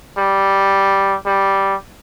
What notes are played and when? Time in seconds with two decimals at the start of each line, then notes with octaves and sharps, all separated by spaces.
0.18 G3
1.26 G3